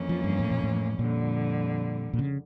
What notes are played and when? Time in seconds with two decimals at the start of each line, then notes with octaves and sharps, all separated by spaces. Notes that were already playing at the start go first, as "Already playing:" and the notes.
Already playing: F2 E3 A#3 C#4
0.09 F3
0.24 G2
0.39 A2
0.51 A#2
0.64 A2
0.99 F2 A#2 D3 G3
2.13 A#2
2.19 C#3